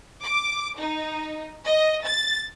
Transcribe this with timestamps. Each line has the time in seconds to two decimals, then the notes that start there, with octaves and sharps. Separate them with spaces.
0.23 D6
0.78 D#4
1.66 D#5
2.05 A6